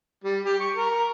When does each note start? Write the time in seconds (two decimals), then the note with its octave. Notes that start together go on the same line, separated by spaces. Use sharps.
0.24 G3
0.46 G4
0.60 C#6
0.76 A#4